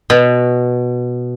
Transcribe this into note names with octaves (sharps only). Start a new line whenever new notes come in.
B2